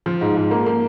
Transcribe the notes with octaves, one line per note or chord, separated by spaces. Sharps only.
F3
G#2
G#2
A#3
A#3